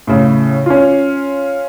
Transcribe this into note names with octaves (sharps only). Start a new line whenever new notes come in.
A2 C#3
C#4 F4